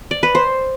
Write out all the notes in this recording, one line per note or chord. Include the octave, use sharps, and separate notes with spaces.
D5
B4
C5